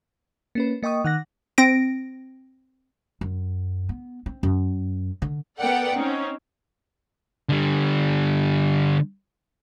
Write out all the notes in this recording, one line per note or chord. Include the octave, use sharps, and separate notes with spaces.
A#3 C#4 B4
A#3 D#5 G5 C#6 D#6
D#3 F#5 F#6 A#6
C4 A#6 D7
F#2
B3
C4
F#2
D3
B3 A4 A#4 D5 F#5 G5
C4 C#4 D#4
D3 G3